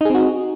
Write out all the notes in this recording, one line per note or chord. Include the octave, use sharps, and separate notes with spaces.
C4 D#4 F#4 G#4